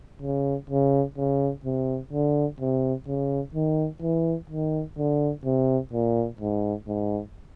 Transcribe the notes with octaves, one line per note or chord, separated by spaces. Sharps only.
C#3
C#3
C#3
C3
D3
C3
C#3
D#3
E3
D#3
D3
C3
A#2
G#2
G#2